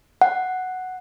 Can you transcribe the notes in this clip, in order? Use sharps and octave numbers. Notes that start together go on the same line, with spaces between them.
F#5